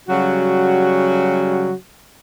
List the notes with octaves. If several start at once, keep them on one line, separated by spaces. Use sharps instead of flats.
C#3 F#3 G3 F#4